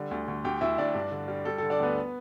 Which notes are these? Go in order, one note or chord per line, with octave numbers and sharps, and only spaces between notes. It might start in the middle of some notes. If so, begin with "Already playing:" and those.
Already playing: D3 G3
D2
D2
D2 G4 G5
D2 E4 E5
D2 D4 D5
G2
D3
G3
G3 A4
A4
D3
D4 D5
D2 B3 B4